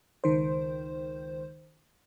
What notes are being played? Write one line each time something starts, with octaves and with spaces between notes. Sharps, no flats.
C#2 D#3 C5